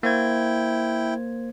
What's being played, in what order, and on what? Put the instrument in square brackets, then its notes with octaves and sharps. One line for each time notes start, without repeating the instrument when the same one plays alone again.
[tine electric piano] A#3 C5 G#6 [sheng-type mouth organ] E4 G5